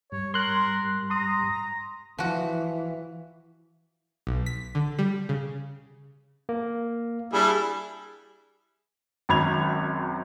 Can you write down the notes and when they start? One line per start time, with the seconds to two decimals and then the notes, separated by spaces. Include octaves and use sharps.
0.12 G#2 G3 C#5
0.34 A#4 C6 F#6
1.10 A#5 C6 D#6
2.18 E3 F3 F#4
4.27 B1
4.46 B6
4.75 D3
4.99 G3
5.29 C#3
6.49 A#3
7.33 G3 D4 E4 G#4
9.29 G#1 F#2 B5 G#6 F7